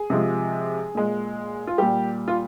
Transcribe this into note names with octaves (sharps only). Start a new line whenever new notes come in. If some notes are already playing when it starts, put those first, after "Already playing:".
Already playing: G#4
C3 F3 G#3
A#2 G#3
F4
A#2 G3 G4
F4